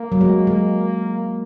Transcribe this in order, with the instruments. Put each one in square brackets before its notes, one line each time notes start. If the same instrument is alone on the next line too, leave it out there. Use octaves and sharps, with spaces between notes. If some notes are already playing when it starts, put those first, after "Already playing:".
Already playing: [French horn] A#3
[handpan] F#3
G#3
G#3